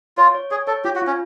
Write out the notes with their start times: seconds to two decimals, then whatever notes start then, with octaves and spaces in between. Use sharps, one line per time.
0.18 F4 C#5
0.35 C#5
0.51 G#4 C#5
0.67 A4 C#5
0.85 F4 G4
0.96 F#4
1.02 F4
1.07 C#4